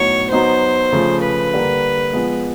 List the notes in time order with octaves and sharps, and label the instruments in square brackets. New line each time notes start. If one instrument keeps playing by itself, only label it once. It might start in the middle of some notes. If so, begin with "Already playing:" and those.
Already playing: [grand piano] A2 F#3 B3 D#4 F#4 [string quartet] C#5
[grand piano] F#3 B3 D#4 [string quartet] C5
[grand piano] C#3 F3 A3
[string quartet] B4
[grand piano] D3 G3 A#3
F3 G#3 B3